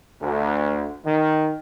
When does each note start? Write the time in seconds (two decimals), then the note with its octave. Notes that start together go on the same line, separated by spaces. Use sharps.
0.22 D2
1.05 D#3